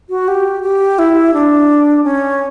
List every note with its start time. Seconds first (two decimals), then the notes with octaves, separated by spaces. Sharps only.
0.10 F#4
0.28 G4
0.63 G4
0.99 E4
1.34 D4
2.04 C#4